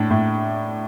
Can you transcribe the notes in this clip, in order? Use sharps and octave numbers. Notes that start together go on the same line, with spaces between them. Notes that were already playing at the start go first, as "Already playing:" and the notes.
Already playing: A2 D4
A2